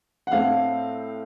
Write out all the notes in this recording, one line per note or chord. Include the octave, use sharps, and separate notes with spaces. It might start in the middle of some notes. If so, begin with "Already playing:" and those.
F#5
A2 A3 C4 F5